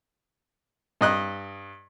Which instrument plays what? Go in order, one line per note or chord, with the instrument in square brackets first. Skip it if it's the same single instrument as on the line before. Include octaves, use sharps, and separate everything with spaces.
[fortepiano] G2 D#5 F#6